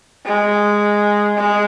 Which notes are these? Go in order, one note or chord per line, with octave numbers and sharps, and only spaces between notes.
G#3
G#3